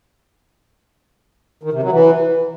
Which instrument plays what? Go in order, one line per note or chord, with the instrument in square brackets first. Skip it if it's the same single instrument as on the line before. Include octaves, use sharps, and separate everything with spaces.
[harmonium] D#3
C3
F#3
E3